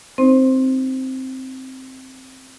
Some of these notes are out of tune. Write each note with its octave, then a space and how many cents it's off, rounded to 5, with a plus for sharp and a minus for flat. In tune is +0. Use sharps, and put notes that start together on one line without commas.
C4 +0 D#4 +0 C5 +0